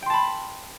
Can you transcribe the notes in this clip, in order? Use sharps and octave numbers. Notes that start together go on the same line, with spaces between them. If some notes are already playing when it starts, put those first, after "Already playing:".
G5 A5 B5 C6